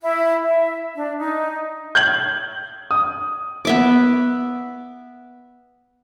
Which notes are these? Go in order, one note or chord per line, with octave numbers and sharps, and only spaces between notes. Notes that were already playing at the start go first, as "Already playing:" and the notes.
E4
E5
D4
D#4
G6 G#6 F#7
D#6
B3 E5 D6